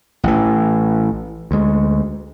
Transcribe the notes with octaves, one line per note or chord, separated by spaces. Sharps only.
A1 E3
D2 G#3